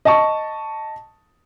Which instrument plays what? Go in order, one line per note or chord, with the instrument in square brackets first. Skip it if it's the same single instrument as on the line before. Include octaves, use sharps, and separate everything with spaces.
[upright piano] D#5 A5 C#6